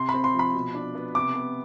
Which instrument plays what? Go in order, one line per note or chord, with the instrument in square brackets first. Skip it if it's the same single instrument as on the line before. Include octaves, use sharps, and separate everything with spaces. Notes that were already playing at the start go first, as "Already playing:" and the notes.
Already playing: [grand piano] C3 C6
B5
C4
C6
F3 B5
B2
D4
B3
C3 D6
B3